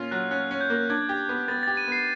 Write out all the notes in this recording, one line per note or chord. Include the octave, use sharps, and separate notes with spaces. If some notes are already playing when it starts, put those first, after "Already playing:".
Already playing: A#2 C#4 F4
F#3 F#6
C#4 F#6
C#4
G6
A#3
D4 G#6
G4
B3
B3 A6
G4 A6
D#7
B3 C7